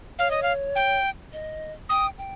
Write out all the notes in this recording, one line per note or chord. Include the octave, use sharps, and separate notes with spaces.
C#5 F5
D#5
F5
G5
D#5
G5 D#6
G5